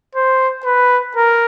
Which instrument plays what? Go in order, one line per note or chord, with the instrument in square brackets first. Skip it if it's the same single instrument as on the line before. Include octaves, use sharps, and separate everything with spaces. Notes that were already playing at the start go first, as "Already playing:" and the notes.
[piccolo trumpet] C5
B4
A#4